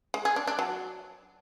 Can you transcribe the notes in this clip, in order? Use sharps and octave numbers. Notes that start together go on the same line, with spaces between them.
G#3
G#4
D4
D4
F#3